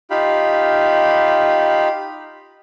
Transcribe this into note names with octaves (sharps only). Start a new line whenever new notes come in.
D#4 F4 G4 F5 B5